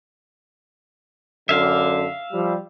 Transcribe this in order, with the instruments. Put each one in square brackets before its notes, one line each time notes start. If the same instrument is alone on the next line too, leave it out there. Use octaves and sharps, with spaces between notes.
[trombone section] F#2 D3 [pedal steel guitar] E5 F5
[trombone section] F3 G3